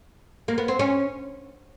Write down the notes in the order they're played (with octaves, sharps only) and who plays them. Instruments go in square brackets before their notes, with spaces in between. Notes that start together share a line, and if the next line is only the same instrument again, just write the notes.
[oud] A#3
B3
C4
C#4